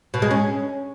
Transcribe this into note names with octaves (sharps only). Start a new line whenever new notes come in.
B2
G#3
C#4